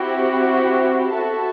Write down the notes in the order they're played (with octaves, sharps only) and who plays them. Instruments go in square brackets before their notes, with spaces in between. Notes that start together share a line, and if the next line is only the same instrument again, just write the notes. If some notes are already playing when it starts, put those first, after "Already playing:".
Already playing: [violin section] C4 E4 G4 [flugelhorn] F#4
[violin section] E4 A4 E5 A5 [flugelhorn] F#4